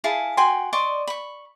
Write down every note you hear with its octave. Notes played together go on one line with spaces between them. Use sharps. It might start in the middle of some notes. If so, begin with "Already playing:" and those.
E4 G#4 F5 A5
F#4 G5 G#5 C6
D5 D#5 C6 C#6
B5 C#6